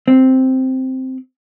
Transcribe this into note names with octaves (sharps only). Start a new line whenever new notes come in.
C4